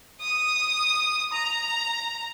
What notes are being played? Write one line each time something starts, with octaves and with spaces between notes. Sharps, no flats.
D#6
A#5